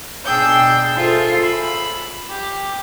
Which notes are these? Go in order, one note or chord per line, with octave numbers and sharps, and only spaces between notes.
B2 D4 G#4 G5 E6 G6
F4 G#4 A4 C5 E5
B5 E6
G4